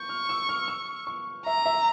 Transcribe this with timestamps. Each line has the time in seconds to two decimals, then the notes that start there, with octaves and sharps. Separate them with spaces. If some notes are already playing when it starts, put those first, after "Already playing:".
Already playing: C#6 G6
0.09 F6
0.29 E6
0.49 F6
0.68 E6
1.07 C#6
1.46 E5 A#5
1.66 E5